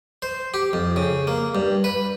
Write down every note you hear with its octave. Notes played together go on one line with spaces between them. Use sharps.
C5
G4
F2
C#3
A#3
G2
B4